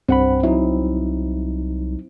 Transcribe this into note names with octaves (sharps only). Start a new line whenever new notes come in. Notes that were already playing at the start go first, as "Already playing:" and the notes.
C2 G2 C4 F#5 B5
F#3 D#4 E4